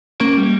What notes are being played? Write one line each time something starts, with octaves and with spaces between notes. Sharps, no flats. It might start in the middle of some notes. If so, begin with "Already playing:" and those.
A#3 C#4
G3